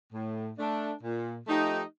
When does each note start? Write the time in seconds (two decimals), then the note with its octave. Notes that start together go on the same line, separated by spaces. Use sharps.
0.13 A2
0.57 A3 D4
1.02 A#2
1.46 F3 A3 D#4 G4